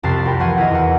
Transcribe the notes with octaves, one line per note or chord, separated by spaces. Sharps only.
C2 F2 A5 F#6 C7
F#4 A#4 C5 G5 B5
E3 F3 F#5 C6 G#6 D#7
D#3 E4 F#4 G#4 A#4 D#5
E2 F#5